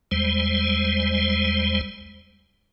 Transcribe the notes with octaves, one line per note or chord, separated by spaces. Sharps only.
E2 G3 G#3 C5